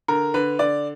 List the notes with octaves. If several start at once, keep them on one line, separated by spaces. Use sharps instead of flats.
D3 A#4
D3 B4
D3 D5